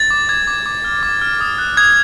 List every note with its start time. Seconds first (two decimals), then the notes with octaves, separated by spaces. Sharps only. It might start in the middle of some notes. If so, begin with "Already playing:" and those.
Already playing: A6
0.11 D6
0.29 D6 G#6
0.47 D6
0.66 D6
0.84 F6
1.03 D6
1.21 F6
1.41 D#6
1.58 F#6
1.77 D#6 G#6